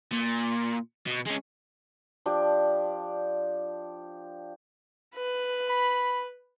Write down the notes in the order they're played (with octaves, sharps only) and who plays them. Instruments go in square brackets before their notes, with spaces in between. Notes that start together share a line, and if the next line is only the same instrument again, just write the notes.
[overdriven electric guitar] A#2
B2
G#3 C#4
[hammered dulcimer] F3 D4 G4
[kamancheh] B4
[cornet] B5